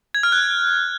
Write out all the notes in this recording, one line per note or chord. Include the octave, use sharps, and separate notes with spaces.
G#6
F6
F#6